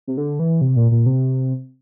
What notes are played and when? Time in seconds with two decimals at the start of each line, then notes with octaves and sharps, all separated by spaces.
0.07 C3
0.17 D3
0.39 E3
0.61 C3
0.76 A#2
0.91 A#2
1.06 C3